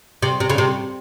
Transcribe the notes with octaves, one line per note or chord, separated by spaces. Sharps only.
C3
C3
C#3
C3